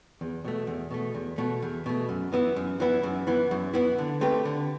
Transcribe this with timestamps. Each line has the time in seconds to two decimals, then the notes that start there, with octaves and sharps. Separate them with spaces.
0.21 E2
0.45 B2 A3
0.67 E2
0.91 B2 A3
1.15 E2
1.38 B2 A3
1.62 E2
1.86 B2 A3
2.09 F#2
2.33 E3 B3 E4
2.56 F#2
2.80 E3 B3 E4
3.03 F#2
3.27 E3 B3 E4
3.51 F#2
3.74 E3 B3 E4
3.98 D3
4.21 A3 C4 G4 B4
4.45 D3